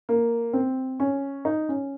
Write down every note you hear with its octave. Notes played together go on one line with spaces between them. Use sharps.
A#3
C4
C#4
D#4
C#4